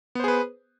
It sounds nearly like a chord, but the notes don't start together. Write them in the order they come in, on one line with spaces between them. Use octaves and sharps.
B3 C5 G#4 B4